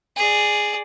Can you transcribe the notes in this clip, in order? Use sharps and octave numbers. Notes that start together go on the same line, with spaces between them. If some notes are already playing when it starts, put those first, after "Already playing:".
G#4 D5